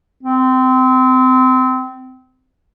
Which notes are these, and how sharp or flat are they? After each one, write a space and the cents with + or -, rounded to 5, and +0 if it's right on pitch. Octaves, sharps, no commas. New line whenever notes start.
C4 -25